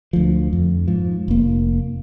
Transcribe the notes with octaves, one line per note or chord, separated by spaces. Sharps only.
D2 F3
F2
G#2 F3
F1 A#3